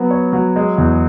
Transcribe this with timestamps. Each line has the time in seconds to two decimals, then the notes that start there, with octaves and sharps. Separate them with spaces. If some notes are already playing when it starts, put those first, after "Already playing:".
Already playing: F#3 B3 F#4
0.11 C#5
0.33 F#3
0.56 G#3
0.78 E2